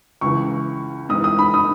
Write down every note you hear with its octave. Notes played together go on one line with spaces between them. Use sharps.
C#2 C#3 E3 C#6
G#2 E3 D#6
D#6
B5
D#6